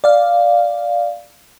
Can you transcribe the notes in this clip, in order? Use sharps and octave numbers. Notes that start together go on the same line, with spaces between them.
D5 F5